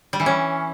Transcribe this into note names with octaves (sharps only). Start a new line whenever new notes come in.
G3
E3
C#4